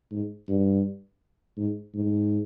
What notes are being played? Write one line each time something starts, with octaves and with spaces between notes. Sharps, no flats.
G#2
G2
G#2
G#2